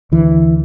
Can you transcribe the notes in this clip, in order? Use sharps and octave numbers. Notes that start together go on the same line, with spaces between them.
D2 D3 E3